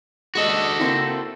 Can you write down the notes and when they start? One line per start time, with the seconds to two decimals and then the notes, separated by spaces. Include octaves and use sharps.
0.35 G#3 F#4 A4 D5 D#5
0.79 A#3 C4 E4